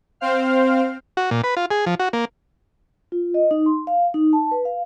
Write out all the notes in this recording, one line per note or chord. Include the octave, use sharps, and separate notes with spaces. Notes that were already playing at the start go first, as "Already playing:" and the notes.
C4 C5 F5 F6
F#4
A#2
B4
F4
G#4
F3
F#4
A#3
F4
D#5
D#4
C6
F5
D#4
A5
B4
F5